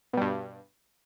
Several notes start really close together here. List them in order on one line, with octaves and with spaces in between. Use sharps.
B2 G3 G2